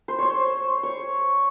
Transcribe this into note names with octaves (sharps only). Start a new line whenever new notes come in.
C5
C5 C#5
C#5